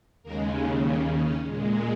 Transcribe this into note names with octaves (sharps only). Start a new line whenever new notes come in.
D#2 C#3 G#3 A#3 A#4
G#3 G#4
G3 G4
C#4
A#2 G#3